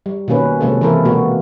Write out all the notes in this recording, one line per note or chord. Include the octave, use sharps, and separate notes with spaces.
G3
B2 D#3 A#3 C#4 B4
C3 F3 G#3 A#3 C#4 A4
E3 C4 E4 A4 A#4
B2 G#3 A#3 B3 F#4